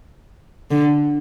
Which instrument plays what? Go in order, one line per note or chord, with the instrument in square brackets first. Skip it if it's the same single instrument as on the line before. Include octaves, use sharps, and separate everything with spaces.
[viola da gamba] D3